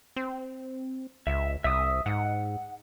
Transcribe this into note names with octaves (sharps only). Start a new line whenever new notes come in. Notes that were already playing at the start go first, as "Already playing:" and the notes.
C4
C#2 E5
C2 E5 D#6
G#2 F#5